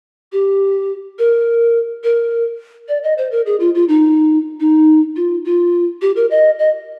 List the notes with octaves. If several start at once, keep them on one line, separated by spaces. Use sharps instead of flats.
G4
A#4
A#4
D5
D#5
C5
A#4
G#4
F4
F4
D#4
D#4
F4
F4
G4
A#4
D#5
D#5